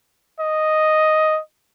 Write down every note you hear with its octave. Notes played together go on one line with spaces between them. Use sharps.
D#5